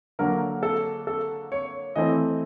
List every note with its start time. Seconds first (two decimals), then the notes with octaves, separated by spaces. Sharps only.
0.19 D3 F#3 A#3 A#4
0.63 A4
1.07 A4
1.52 C#5
1.96 E3 A3 C4 D#5